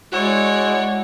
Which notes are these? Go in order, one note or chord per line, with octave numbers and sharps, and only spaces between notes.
G#3 E4 F#4 C#5 D5